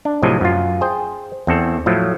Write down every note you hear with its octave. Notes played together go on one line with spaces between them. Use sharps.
D4
A2 C3 F3 F#3 D#5 G#5
F#2 F4
G#4 C5 G5
E2 C4 A4
A2 F3 F#3 A3